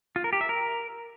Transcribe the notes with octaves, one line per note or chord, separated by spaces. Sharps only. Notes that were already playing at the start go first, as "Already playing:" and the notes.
F4
A#4
G4
E5
A#4